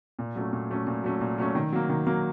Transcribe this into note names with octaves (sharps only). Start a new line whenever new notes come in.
A#2
F#3 A3 C#4
A#2
F#3 A3 C#4
A#2
F#3 A3 C#4
A#2
F#3 A3 C#4
D#3
F#3 A#3
D#3
F#3 A#3